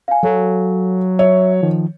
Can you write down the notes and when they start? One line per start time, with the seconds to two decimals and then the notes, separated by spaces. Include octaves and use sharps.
0.08 F5 G#5
0.23 F#3 A4
1.19 C#5 E5
1.63 D#3 F3